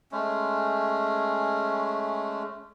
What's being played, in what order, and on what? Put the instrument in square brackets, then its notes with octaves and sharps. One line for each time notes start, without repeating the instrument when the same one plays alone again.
[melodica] G#3 A3 C#4